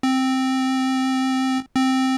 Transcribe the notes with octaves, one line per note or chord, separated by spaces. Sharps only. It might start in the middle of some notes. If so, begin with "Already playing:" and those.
C4
C4